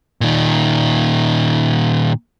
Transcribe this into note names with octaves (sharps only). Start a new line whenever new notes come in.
A#2 D#3